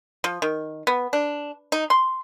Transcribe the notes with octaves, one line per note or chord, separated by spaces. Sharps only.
F3
D#3
B3
D4
D#4
C6